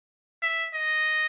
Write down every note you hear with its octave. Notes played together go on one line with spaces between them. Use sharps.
E5
D#5